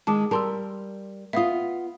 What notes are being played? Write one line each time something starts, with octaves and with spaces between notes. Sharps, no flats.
D#3 G#3 A5 D6
G3 A#4 A5 C6 E6
B3 F4 E5 F5 D#6